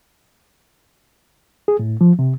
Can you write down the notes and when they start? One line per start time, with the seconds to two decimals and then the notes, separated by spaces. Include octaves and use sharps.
1.68 G#4
1.79 A2
2.01 F3
2.19 C3